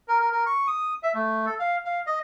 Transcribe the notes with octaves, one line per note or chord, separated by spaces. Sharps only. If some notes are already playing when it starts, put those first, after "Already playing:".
A#4
A#4
A#4
C#6
D#6
E5
A3
A4
F5
F5
D#5